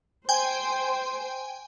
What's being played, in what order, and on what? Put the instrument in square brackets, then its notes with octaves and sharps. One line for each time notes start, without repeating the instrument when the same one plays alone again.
[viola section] C5 [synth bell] G5 G#5